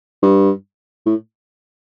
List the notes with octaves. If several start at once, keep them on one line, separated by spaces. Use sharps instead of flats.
G2
A2